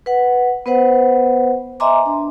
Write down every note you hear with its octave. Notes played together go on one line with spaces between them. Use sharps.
B4 F#5
B3 B4 C5 F#5
D#5 E5 G#5 A#5 C6 D6
D4